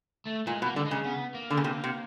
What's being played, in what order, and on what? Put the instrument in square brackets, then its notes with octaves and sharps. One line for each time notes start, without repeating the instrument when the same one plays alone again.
[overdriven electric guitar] A3
[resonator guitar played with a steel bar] A#2 [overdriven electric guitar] G#3
[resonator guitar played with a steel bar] B2
[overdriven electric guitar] A#3
[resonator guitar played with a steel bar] D3 [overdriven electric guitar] G3
[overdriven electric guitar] G#3
[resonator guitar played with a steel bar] C#3
[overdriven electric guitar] B3
A#3
[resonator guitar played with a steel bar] D3
C#3
C3
C3